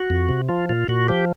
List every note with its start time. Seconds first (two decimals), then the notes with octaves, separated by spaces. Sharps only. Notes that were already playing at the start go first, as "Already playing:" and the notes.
Already playing: F#4
0.10 F2
0.29 C3
0.49 F3 F4
0.69 A#2 F4
0.88 A#2 F#4
1.08 F3 G4